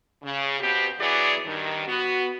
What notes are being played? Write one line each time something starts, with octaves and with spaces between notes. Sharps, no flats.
C#3
B2 B3 C4 G4
E3 F#3 B3 G#4 D5
G2 D#3
B3 F#4